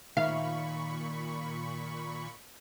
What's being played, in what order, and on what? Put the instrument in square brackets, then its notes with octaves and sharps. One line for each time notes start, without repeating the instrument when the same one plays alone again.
[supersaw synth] A#2 B5 C#6 [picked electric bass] D#3 [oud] F5